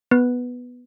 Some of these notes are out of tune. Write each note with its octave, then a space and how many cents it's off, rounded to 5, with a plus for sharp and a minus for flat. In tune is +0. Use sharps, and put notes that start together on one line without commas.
B3 +0 B4 +0